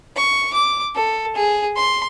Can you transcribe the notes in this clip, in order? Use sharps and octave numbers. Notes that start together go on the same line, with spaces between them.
C#6
D6
A4
G#4
C6